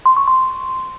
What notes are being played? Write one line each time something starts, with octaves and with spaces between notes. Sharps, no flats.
C6
C#6
C6